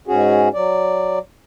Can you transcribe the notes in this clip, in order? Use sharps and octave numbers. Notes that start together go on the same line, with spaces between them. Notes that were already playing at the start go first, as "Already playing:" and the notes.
G#2 C#4 F#4 G#4
F#3 D5